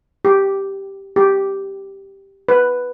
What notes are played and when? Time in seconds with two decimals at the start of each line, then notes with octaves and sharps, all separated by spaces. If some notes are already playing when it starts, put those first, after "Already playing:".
0.25 G4
1.16 G4
2.48 B4